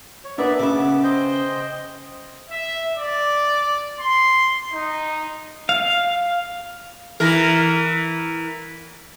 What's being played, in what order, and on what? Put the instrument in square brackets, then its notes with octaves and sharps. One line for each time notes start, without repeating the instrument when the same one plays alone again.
[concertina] C#5
[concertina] B3 D5 E5 [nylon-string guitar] D4 A#4 B4
[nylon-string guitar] C#3 C#4 E5 [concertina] B3 D6
[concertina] C5 D#5 G5
[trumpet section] E5
D5
C6
D#4
[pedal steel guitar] F5
[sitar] E3 A#4